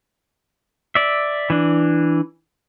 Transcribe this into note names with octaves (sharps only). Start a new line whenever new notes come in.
D5 E5
E3 D4